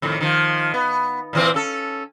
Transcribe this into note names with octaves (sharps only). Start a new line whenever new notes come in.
F2 A2 D#3
D#3 F3
B3
A#2 E3 C4
C#4 A4